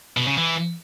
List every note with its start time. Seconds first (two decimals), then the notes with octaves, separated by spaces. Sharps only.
0.17 B2
0.27 C#3
0.38 E3